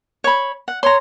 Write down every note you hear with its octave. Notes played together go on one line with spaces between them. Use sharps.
C#5 B5
F#5
C#5 A#5 C6